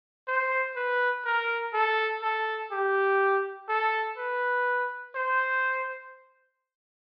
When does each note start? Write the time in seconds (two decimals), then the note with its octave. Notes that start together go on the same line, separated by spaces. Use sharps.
0.28 C5
0.76 B4
1.25 A#4
1.74 A4
2.22 A4
2.71 G4
3.69 A4
4.18 B4
5.15 C5